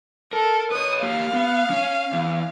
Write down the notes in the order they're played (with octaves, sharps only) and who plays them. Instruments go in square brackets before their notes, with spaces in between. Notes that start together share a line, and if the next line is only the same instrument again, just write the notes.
[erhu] A4 [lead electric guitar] A#4
[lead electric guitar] B4 C#5 [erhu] D#6
[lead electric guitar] A#3 G4 [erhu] F5
[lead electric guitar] B3
C#4 C#5
E2